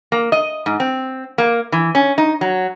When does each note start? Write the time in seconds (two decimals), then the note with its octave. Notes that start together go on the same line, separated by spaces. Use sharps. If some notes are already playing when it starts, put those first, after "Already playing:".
0.12 A#3
0.32 D#5
0.66 G#2
0.80 C4
1.38 A#3
1.72 E3
1.95 C#4
2.18 D#4
2.41 F#3